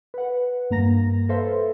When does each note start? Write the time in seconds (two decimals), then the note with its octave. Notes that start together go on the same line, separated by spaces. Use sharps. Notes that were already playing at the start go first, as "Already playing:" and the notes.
0.14 B4 F#5
0.70 G2 A#3 A#5 A#6
1.29 A4 B4 C5 E5 F5 C6